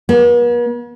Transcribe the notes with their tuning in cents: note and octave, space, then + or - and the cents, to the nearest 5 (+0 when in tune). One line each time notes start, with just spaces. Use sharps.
B3 -45